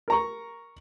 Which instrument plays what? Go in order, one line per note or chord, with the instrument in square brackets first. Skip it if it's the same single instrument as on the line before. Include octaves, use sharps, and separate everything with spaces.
[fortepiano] A#4 A#5 C#6